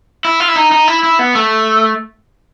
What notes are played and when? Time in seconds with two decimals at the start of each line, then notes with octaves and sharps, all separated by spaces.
0.25 E4
0.40 F4
0.48 E4
0.56 D#4
0.72 D#4
0.88 E4
1.03 E4
1.19 B3
1.35 A3